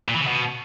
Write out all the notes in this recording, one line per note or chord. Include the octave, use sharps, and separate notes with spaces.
A#2
E3
C#3
B2